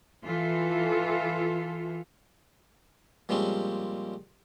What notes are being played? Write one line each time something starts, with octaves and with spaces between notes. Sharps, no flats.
E3 F4 A4
A#2 F3 G3 G#3 C4 C#4